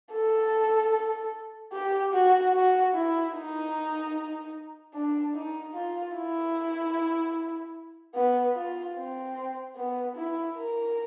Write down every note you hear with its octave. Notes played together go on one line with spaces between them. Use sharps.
A4
G4
F#4
F#4
E4
D#4
D4
D#4
F4
E4
B3
F4
C4
B3
E4
A#4